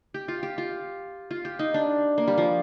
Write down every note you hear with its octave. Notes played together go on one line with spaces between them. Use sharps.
G4
F4
G4
F4
F4
G4
D#4
D4
A#3
G3
F3